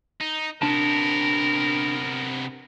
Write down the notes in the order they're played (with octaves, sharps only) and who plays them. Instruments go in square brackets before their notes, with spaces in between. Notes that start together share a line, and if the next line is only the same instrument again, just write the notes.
[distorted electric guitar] D#4
[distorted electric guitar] C3 B3 [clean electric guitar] D4 A5 [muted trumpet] A#4